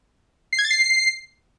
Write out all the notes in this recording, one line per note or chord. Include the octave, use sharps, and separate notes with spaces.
C7
G#6
A6
C7